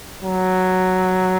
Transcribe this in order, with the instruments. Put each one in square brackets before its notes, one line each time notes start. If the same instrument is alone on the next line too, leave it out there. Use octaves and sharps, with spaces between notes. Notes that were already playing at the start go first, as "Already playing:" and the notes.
[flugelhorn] F#3